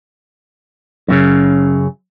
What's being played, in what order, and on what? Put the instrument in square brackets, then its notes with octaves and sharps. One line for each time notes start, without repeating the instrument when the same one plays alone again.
[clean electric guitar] F#2 A#2 C#3